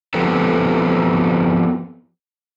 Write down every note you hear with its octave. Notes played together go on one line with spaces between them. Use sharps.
F3 B3 C4 G4 A4 B4